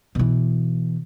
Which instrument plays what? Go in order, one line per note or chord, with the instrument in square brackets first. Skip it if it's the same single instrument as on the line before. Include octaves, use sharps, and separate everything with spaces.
[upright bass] B2 E3